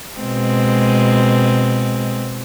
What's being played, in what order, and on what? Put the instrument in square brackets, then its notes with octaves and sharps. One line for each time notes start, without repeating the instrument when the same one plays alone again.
[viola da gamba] B2 G#3 C4